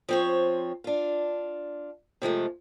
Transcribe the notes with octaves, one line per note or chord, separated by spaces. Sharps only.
F3 C4 C#5
D4 F4
C3 F3 G#3 A3